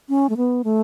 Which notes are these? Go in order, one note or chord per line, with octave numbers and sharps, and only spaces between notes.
C#4
A3
B3
A3